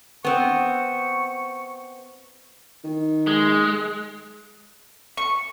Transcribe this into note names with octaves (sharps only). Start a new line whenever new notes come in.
B3 C4 C#6
D#3
G#3
C#6